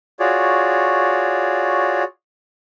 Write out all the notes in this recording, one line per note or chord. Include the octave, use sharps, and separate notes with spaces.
F4 F#4 G#4 C#5 D5